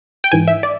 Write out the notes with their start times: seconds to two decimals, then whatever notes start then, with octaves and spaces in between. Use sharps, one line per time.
0.24 G5
0.32 G#2 E3 G#5
0.48 E5
0.63 D5